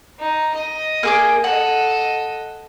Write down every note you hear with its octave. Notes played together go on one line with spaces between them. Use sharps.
D#4
D#5
A#3 G#4 D6
A4 D#5 F#5